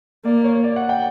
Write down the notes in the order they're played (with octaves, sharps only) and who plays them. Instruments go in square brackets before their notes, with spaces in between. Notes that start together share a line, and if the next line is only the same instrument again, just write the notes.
[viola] A#3 [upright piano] D5
[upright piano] C#5
D5
F#5
G5